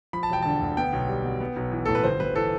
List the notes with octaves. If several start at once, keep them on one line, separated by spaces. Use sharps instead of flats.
F3 B5
A5
E1 G5
D3 A5
D2
B3 G5
B1
G3
B2
B3
B1
E3
A2 A4
B4
G1 C5
G1 B4
E3 A4